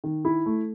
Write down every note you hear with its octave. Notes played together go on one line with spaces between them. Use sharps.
D#3
E4
A3